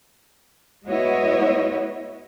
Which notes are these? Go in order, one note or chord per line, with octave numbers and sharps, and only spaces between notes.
G#3 B3 E4 F#4 C#5 D#5